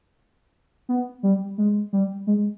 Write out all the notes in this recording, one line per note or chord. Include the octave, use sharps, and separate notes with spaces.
B3
G3
G#3
G3
G#3